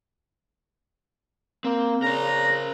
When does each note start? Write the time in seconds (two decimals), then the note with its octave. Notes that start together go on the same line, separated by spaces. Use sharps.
1.65 A#3 C4
2.02 C#3 A#4 C5 A#5